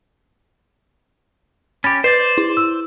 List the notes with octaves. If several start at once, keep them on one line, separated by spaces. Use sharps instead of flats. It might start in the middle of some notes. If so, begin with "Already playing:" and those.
C#4 G4 B5 A6
B4 C5 D5 A6 C7
E4
E6